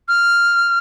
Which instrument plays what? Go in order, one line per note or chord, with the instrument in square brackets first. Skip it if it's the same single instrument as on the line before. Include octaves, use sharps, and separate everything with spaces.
[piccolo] F6